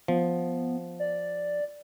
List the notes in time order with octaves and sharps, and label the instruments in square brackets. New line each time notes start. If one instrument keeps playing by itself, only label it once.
[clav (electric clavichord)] F3 [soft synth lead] B3
[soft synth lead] D5